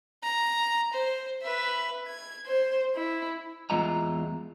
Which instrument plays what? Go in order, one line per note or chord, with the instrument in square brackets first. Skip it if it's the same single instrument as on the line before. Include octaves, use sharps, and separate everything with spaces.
[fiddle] A#5
C5
B4 E5
[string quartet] G#6
C5
E4
[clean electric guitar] E2 G#3 F4 D#5 E5 A#5